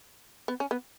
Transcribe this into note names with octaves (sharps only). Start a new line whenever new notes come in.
B3
C#4
B3